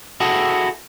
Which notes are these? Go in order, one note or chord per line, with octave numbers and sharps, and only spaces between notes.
E4 F#4 G#4 A4